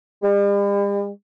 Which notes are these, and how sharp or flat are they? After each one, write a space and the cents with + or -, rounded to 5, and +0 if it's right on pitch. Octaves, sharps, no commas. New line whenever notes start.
G3 +45